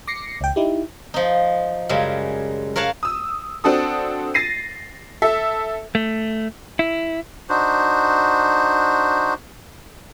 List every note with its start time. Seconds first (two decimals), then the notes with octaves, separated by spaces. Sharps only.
0.07 D6 A#6 C7 C#7
0.41 C#2 G5
0.56 D#4 E4 G4
1.14 F3 D#4
1.89 F#2 C#3 G3 G#3
2.76 A#4 C#5 F5 F#5 A5
3.03 D#6 E6
3.64 C4 D4 F#4 A4 D#6
4.34 A6 A#6 C7 D#7
5.22 A4 E5
5.95 A3
6.79 E4
7.49 D4 D#4 F#4 C5